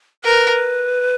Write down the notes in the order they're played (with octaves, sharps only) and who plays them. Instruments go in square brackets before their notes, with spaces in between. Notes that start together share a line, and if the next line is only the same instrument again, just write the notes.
[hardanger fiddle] A#4 [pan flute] B4